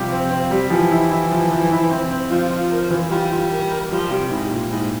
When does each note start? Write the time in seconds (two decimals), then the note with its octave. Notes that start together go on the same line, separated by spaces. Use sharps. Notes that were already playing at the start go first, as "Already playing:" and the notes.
Already playing: C3 F3 G3 C4 G4
0.11 C4
0.31 C4
0.51 G3
0.70 E3 F3
0.91 E4
1.11 E4
1.31 F3
1.51 F3
1.71 E4
1.90 C4
2.11 C4
2.30 F3 F4
2.50 F4
2.71 A#4
2.90 E3
3.10 G3 F4
3.31 F4
3.51 A#4
3.71 A#4
3.91 F3 G3
4.11 C3 G3
4.30 G#2 E4
4.50 A#2
4.70 G#2 E4